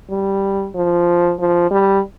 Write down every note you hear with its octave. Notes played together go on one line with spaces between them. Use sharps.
G3
F3
F3
G3